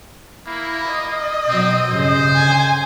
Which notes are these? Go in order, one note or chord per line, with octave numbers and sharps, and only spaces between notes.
A#3 E4
D#5
B2 F#3 C4
G2 C#3 C5
D3 G#5